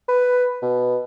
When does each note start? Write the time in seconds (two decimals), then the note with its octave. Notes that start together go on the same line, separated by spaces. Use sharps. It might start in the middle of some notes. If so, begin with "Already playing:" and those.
0.08 B4
0.62 B2